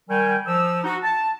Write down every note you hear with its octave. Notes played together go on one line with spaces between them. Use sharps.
D#3 G3 G5 G#5
F3 E6
D#4 F#4
A5